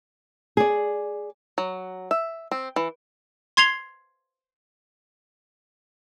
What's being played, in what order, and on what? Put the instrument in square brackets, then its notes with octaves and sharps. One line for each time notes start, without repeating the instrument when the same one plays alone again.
[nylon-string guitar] G#4 D5
[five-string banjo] F#3
E5
C4
E3
[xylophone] C6 G#6 C7 F7 G7